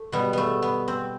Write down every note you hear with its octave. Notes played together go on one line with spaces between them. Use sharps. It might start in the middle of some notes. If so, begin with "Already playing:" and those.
Already playing: A3
B2 G3 B3
A3 B3
B3
C4